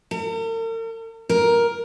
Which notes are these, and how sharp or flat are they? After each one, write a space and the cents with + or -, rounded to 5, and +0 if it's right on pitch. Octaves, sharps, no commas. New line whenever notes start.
A#4 -45
A#4 +10